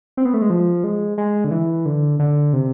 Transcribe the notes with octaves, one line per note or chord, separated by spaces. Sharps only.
C4
B3
A3
G#3
F3
G#3
G#3
D3
E3
D3
D3
C3